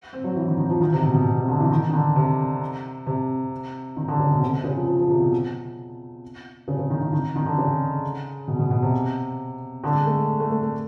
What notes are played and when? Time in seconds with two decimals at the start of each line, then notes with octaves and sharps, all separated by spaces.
0.13 C4
0.24 F#3
0.36 E3
0.47 D#3
0.58 D#3
0.69 F3
0.81 D#3
0.93 C3
1.03 B2
1.14 B2
1.26 B2
1.37 C3
1.48 D3
1.60 E3
1.71 D#3
1.89 D#3
1.93 D3
2.16 C3
3.06 C3
3.97 D#3
4.08 D3
4.20 C#3
4.31 B2
4.42 C3
4.53 C3
4.64 C#3
4.76 F3
4.87 F3
4.99 F3
5.10 C3
5.21 B2
6.68 C#3
6.79 C#3
6.90 D#3
7.01 D#3
7.13 D#3
7.36 D#3
7.46 D3
7.58 C#3
8.48 B2
8.59 B2
8.70 B2
8.82 C3
9.84 D3
9.94 G#3
10.06 A3
10.40 A3
10.51 A3
10.63 A3